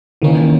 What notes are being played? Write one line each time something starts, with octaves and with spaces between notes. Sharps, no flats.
D#3 E3 A#3 C#4